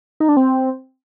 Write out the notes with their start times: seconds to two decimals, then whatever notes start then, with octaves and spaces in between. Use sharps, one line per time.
0.20 D#4
0.29 D4
0.37 C4